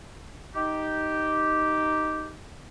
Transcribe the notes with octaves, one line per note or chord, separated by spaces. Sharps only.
D#4 G4